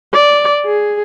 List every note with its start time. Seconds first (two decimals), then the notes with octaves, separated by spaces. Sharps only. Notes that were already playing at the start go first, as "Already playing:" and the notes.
0.13 D5
0.66 G#4